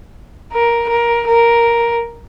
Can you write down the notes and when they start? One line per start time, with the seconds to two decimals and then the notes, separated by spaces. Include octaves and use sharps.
0.53 A#4
0.89 A#4
1.27 A#4